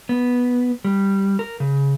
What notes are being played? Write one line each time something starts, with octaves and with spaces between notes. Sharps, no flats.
B3
G3
A#4
C#3